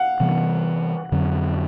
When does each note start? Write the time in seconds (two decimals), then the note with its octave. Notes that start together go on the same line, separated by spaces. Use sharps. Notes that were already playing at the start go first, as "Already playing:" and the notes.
Already playing: F5 F#5
0.20 C3 E3 G3 B3
1.12 F2 D3 F#3